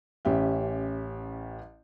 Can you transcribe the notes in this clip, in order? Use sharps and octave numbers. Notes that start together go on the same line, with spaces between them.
A1 C#4 G4 E5